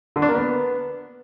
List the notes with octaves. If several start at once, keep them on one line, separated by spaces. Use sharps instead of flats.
D3
D4
A#3
B3